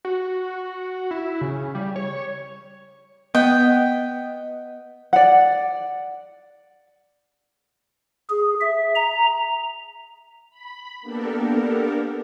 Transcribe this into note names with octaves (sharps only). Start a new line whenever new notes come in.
F#4
E4
C#3
G3
C#5
B3 D#5 G5
D5 F#5
G#4
E5
A#5
B5
A#3 B3 D4 G4 A4 A#4